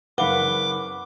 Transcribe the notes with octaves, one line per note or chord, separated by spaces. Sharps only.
F#1 B4 F5 F#5 D6 G7